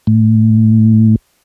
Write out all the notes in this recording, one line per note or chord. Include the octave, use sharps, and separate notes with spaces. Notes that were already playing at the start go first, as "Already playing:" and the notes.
A2